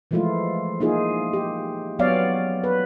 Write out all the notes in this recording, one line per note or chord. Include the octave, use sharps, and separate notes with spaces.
E3 F3 G#3 A3 E4 F4
A#3 D#4 F4 G#4
G4
F#3 B3 C#5 D5 F5
B4